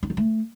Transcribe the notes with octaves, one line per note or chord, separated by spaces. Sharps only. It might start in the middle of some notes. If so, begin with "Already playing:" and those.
D#4
F#3
A3